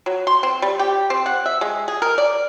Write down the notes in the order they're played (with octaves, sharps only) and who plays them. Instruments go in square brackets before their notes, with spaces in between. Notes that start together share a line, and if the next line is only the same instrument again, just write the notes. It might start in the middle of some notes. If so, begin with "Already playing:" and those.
[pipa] F#3
C6
C4
G3
G4
C4
F#5
E5
G#3
G#4
A#4
D5